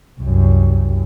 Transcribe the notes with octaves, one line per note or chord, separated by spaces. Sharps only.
C2 F#2